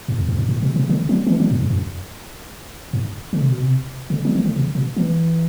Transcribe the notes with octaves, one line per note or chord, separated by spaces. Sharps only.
G2
E2
F#2
G2
A2
B2
C3
D3
F#3
F#3
E3
F#3
G2
F#2
F#2
G2
D3
C3
B2
C3
C3
D3
F#3
E3
D3
C3
B2
E3